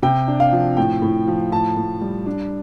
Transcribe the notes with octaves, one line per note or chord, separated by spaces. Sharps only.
C3 G5
D4
F5
F3
A2 G5
A2
F3
A2 A5
A2
G3
D4